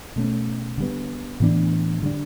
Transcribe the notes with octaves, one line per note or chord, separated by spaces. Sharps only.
B2 A3 C#4
D3 G3 B3
A2 E3 B3 D4
D3 G3 D4